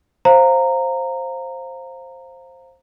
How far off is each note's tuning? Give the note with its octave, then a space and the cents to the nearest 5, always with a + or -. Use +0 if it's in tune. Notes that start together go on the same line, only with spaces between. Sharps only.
C5 +15 F5 +0 A#5 -15